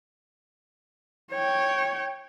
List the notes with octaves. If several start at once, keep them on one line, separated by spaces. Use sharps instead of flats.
C#5 G5